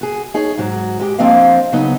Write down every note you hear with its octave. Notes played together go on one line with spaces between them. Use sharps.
F#4 G#4
D#4 G#4 C#5
G#2 F#3 F#4
G#3 G4
F3 A#3 C4 D4 D#5 F5
C#3 F#3 B3 D#4